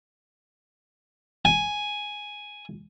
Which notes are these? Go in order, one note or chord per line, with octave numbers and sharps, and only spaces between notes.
G#5